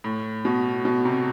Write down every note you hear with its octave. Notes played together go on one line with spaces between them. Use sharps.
A2
B2
B2
C3